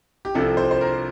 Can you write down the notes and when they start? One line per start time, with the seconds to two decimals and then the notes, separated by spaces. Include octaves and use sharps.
0.25 G4
0.35 C2 C3 F3 A4
0.57 C5
0.71 C5
0.81 A#4